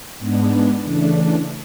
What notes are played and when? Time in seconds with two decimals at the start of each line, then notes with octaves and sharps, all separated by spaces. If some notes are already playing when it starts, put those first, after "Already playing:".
0.19 G#2 G#3 B3 D4
0.83 C#3 E3 A3 D4